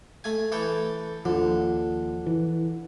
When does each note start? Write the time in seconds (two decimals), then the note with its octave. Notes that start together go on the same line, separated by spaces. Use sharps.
0.24 A3 G#5
0.52 E3 A4 G5
1.25 D#2 D3 F3
2.26 E3